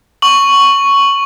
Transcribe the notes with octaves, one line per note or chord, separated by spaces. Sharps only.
C#6 F#7